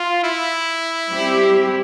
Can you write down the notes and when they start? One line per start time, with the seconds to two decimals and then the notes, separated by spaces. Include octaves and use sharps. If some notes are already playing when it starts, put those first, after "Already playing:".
Already playing: F4
0.24 E4
1.08 G3 C4 G4